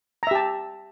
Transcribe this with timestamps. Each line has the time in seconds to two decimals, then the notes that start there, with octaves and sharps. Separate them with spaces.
0.23 A#5
0.27 E5
0.31 G4
0.35 A5